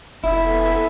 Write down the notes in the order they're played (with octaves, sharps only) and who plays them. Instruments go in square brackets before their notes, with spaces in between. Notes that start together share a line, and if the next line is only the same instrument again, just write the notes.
[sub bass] F1 [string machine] B3 A4 G#5 [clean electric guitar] E4 [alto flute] E5